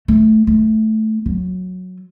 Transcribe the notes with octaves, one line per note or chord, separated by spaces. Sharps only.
A3
A3
F#3